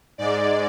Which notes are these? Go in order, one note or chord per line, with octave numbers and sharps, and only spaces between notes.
G#2 G#3 D5